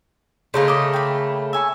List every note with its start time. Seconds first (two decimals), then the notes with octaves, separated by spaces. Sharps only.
0.54 C#3 A3 A#3 D#4 C5
0.68 D#5 D6
0.93 G5 B5
1.53 E5 G#5 C#6